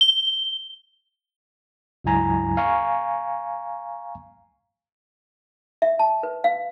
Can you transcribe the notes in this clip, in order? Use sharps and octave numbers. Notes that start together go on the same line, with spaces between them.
G7
C#2 G2 F#3 E4 G#5 A#5
F5 G#5 A#5 C#6
E5
A5
B4
F5